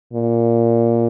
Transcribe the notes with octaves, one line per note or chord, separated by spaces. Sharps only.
A#2